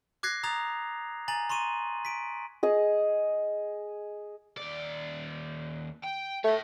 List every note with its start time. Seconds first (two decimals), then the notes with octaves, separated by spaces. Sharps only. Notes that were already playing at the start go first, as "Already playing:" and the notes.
0.23 D6 F#6 G#6 A#6 C7
0.43 A#5 D#6 G#6 A6 F7
1.28 G#5 A#5 A6 F#7
1.49 A#5 C6 C#6 D#7
2.05 B6 D7
2.63 G#4 D#5
4.57 D#2 D5
6.04 G5
6.44 A3 C#5 E5